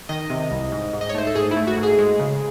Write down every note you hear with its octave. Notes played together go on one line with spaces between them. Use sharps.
D#3 D#5
C3
C2
G#2
G#2
D#5
C#5
A3 C5
A4
G#2 G#4
E4
A3
F#4
G#2
G#4
G#3
C#3